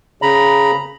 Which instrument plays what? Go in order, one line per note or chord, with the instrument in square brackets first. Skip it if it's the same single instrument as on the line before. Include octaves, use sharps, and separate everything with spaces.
[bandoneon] C#3 A#5 B5